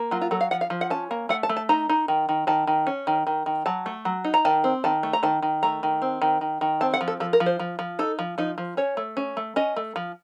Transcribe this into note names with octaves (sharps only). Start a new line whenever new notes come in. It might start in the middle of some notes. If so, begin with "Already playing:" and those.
Already playing: A#3
F#3 F4
F4
F#3 A4
F5
F3 F#5
F5
F3
F#5
C#4 A5
A#3
A3 F#5
A5
A3
A5
D#4 A#5
D#4
D#3
D#3
D#3 A5
D#3
C#4
D#3
D#3
D#3
F#3 A5
A3
F#3
D#4
A#5
D#3 A5
C4
D#3 A5
A3
A#5
D#3 A5
D#3
A3 A#5
D#3
C4
D#3
D#3
D#3
C4 A5
F#5
F3
A4
F3 A4
A#4
F3
C5
F3
F3
D#4 A4
F3
F3 D#4
F3
C#4 C#5
A3
C#4
A3
C#4 D#5
A3
F3